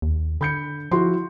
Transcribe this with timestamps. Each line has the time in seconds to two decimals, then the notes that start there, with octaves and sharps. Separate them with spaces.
0.02 D#2
0.41 D3 B5 G6 C#7
0.92 F3 E4 F#4 C6